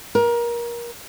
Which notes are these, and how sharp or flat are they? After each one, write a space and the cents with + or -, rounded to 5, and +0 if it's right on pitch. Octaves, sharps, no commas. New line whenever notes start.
A#4 +25